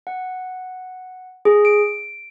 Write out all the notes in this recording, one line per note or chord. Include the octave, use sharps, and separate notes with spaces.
F#5
G#4
D7